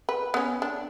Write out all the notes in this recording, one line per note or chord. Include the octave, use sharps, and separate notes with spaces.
B4
B3 C#4
D4